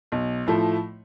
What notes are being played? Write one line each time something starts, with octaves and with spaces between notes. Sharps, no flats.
B1
A2 F3 A3